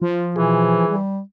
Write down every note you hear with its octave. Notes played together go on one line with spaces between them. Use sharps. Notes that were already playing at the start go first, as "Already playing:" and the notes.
F3 F4
B2 E3 G#4
G3